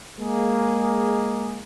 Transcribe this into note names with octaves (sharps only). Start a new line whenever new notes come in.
G#3 A#3 G#4